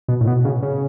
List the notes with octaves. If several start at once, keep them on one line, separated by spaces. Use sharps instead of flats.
B2
A2
B2
C#3
C#3